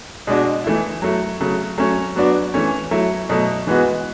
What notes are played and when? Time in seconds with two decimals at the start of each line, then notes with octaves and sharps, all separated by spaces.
0.27 B2 G#3 D4 F#4
0.64 E3 A3 E4
1.02 F#3 A3 E4
1.40 C#3 F#3 A3
1.78 F#3 A3 C#4
2.16 F#3 B3 D4 F#4
2.54 E3 A3 C#4
2.91 F#3 A3 E4
3.29 B2 F#3 A3
3.67 E3 G#3 B3 F#4